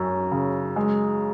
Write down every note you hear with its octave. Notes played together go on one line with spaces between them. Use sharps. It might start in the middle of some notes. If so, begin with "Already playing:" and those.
Already playing: F#2 C#4
C#3
G#3